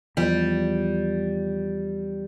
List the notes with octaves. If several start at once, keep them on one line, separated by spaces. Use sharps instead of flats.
E2 F3 G3